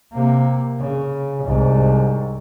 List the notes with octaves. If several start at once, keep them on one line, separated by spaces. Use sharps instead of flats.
C3 A#3
C#3
C2 G#2